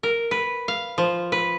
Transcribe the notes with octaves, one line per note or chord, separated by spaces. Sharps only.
A#4
B4
F5
F3
B4